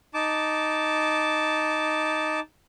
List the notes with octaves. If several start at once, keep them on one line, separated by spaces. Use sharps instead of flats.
D#4 A5 D6